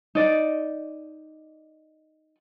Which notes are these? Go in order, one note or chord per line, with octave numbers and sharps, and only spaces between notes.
D#4 D5